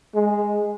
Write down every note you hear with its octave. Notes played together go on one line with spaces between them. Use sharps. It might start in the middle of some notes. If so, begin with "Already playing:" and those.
G#3